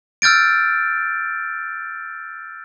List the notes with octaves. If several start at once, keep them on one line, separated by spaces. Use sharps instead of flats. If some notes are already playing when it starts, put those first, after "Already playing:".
E6 F6 G6 A6 D7